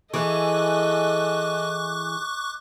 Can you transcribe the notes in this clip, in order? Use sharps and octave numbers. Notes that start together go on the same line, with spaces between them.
E3 G#4 A4 B4 D#5 C#6 D6 F#6